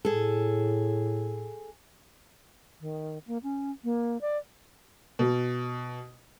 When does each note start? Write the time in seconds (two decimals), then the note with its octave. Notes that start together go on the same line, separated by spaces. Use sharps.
0.05 A2 G#4 A4
2.81 D#3
3.27 A#3
3.43 C#4
3.84 A#3
4.21 D5
5.19 B2